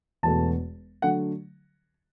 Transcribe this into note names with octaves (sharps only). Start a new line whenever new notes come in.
E1 E2 B2 A3 A5
D3 F#3 A3 F#5